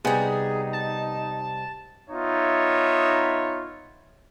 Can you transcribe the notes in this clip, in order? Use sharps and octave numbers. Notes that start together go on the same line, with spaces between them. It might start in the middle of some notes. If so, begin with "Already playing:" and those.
C3 G3 B3 D#4 G#4
A5
B3 D#4 F4 C#5 E5